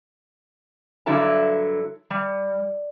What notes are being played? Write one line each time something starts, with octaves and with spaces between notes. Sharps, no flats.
G2 D3 F#3 E4 A4 A#5
G3